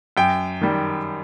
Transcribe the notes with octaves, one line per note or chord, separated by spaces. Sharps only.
F#2 G5
D#3 G3